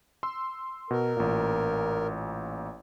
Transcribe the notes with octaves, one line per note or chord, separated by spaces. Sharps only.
C6 E6
B2 A#4
A1 A#2